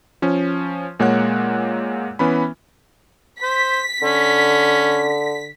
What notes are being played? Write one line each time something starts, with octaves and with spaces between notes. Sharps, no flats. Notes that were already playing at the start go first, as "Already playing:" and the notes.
F3 C#4
A#2 G#3 A#3 C#5 F#5 F#6
E3 B3 C#4 B5
C5 B6
D3 C#4